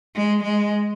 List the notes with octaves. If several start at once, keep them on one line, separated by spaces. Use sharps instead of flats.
G#3
G#3